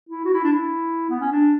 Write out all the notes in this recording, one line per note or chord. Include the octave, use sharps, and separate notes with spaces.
E4
F#4
E4
D4
E4
B3
C#4
D4